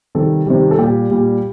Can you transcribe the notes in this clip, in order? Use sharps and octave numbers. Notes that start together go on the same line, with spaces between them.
C3 D#3 G3 A4
C3 D#3 G3
A4
A#2 G3 G4
A#2 G3